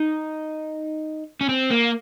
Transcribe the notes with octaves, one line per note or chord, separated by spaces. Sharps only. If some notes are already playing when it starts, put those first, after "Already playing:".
Already playing: D#4
C#4
C4
A#3